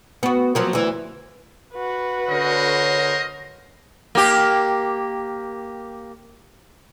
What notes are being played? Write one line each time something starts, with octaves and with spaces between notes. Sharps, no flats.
B3 F#4
F3 F#3 A#3
D2 E3
F#4 B4
D3 A#4 C5 C#5 D#5
A#3 G4